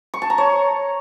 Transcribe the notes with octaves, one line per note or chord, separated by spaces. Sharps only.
C#6
A5
A#5
C#5